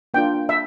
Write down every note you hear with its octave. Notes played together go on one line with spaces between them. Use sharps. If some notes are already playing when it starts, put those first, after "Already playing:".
A#3 D4 F4 G5
E5